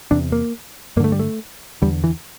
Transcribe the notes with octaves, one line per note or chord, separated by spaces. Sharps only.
E2 C3 D4
A#3
G2 D3 A3 A#3
G3
A3
E2 D3 G3
E3